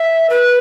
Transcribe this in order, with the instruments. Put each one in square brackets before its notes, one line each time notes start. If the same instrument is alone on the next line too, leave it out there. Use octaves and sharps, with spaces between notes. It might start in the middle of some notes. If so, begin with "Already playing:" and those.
Already playing: [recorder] E5
B4